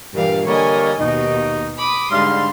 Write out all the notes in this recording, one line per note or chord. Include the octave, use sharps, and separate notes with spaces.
G2 A#2 E3 G3 F5
D3 G3 A#3 C#5 D#5 G#5
D#2 B2 D#4
B5 D6 D#6
G#2 D3 G3 F5 C6